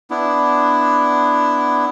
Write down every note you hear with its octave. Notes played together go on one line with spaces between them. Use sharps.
B3 D4 E4